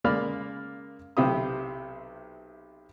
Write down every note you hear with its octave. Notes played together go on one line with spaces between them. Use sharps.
C#3 G#3 A#3 D5 B5 F6
B1 C3 E4 G4 F5 D#6